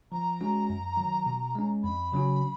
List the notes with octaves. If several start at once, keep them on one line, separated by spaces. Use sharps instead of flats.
F3 A#5
G#3 C#4 F#4
F#2
D#3 F#3
B2
G#3 C#4
F2 B5
C#3 F#3 C#4 F#4